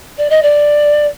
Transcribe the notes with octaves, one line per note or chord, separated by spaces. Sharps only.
D5
D#5
D5